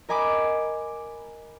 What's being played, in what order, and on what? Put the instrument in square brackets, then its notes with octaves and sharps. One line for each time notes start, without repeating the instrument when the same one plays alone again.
[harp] A#4 D#5 G#5 B5 D6